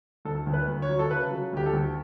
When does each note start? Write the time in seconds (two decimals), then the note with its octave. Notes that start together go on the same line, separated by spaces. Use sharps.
0.25 D2 A4
0.47 D2
0.53 B4
0.68 D2
0.82 C#5
0.89 F#3
0.99 A4
1.10 C#3 B4
1.31 F#3
1.53 D2 G4
1.66 A4
1.73 D2